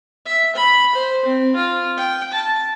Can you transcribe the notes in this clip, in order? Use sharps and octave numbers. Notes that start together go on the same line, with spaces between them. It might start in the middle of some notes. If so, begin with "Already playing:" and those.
E5
B5
C5
C4
F4
G5
A5